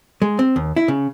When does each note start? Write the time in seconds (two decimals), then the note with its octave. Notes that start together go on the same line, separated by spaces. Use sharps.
0.22 G#3
0.39 C4
0.56 D#2
0.76 E4
0.88 C#3